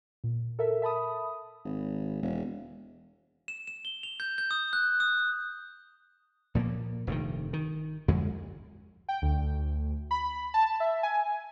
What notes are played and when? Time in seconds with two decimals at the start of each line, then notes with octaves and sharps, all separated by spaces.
0.24 A#2
0.59 A4 A#4 E5
0.82 E5 A5 B5 D#6
1.65 G#1
2.23 E1
3.48 E7
3.67 E7
3.85 G7
4.03 F7
4.20 G6
4.38 G6
4.51 D#6
4.73 F#6
5.00 D#6
6.55 A#2 F3 G#3 A#3
7.07 F1 G2 B2 D#3
7.53 D#3
8.08 F2 D3 G#3
9.09 G5
9.22 D2
10.11 B5
10.54 A5
10.80 E5
11.03 G#5